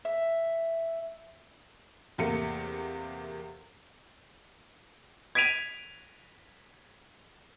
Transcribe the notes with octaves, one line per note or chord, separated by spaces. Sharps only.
E5
E2 C3 A3 A#3 C#7
G#6 B6 D7 D#7 F7